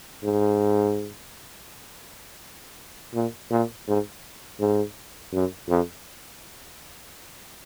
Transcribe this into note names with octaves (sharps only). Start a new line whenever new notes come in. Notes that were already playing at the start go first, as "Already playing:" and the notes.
G#2
A#2
A#2
G#2
G#2
F#2
F2